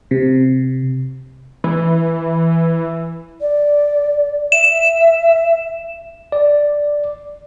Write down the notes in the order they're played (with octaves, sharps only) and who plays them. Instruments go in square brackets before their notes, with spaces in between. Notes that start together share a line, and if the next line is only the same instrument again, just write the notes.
[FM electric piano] C3
[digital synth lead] E3
[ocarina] D5
[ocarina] E5 [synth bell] E7
[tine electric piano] D5